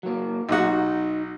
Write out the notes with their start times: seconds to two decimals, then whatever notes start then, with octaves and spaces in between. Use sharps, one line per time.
0.03 F#3 A#3
0.49 B1 D#4 F#4